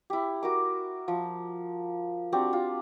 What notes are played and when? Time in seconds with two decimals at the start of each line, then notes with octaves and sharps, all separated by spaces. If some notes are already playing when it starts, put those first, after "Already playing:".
0.10 E4 G4
0.43 F#4 A#4 D6
1.08 F3
2.32 C4 D4 F#4 G4
2.53 F4